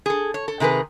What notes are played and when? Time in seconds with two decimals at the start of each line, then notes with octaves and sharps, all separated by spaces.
0.06 G#4 A4
0.34 C#5
0.48 A4
0.60 C3 D#3 G#4 A#4 B4